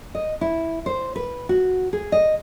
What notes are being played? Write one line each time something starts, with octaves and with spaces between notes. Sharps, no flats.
D#5
E4
C5
B4
F#4
G#4
D#5